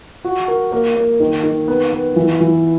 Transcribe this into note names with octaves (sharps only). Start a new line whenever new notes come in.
F#4
A#4
A#3
A#3
D#3
D#3
B3
B3
E3
E3